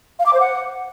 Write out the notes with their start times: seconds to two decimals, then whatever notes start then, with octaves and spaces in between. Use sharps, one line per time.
0.19 F5
0.26 D6
0.33 C5
0.40 F#5